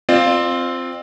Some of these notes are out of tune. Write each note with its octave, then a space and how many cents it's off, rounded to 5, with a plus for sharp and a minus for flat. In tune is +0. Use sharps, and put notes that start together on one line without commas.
C4 +0 F4 +0 D5 +45